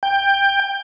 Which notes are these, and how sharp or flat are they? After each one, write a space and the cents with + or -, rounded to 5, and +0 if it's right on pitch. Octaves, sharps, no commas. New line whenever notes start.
G5 +15